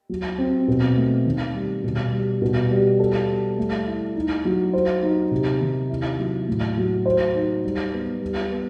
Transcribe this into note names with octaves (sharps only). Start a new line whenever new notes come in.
F#3
C4
B2
A3
D#3
G3
B2
G3
B2
G3
A4
G3
A3
E4
D#4
F#3
C5
D#4
C3
D#3
E4
F#3
A2
F#3
C5
D#4
G3
B3
G3
B3